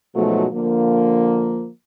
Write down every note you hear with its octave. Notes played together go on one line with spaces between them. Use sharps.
G#2 B2 F3 F#3 A3
D3 F3 A#3